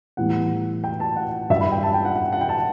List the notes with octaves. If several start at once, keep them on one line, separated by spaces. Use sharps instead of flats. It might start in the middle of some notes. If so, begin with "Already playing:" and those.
A2 E3 G3 B3 F#5
G5
A5
F#5
G2 F#3 C#4 E4 E5
B5
G5
A5
G5
F#5
F#5
F#5
G5
A5